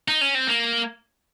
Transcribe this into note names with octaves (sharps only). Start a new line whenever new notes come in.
D#4
C#4
C4
A#3